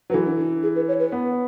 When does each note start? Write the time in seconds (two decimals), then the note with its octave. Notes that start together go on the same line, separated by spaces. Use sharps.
0.10 F#3 B4
0.14 E3 A4
0.25 D4
0.39 D4
0.63 G#4
0.76 B4
0.88 C#5
1.00 B4
1.12 B3